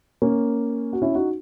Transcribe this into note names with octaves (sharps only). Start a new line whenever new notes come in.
A#3 C#4
F#4
C#4 E4
D#4 F#4